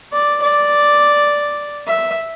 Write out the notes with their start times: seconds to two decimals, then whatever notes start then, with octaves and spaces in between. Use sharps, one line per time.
0.13 D5
0.42 D5
1.87 E5